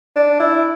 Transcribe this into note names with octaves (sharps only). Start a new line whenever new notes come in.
D4
E4